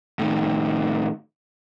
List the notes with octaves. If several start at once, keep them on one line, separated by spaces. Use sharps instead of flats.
A2 D#3